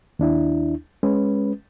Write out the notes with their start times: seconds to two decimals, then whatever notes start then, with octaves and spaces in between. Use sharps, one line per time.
0.19 D#2 D4 E4
1.03 G#3 C#4 B4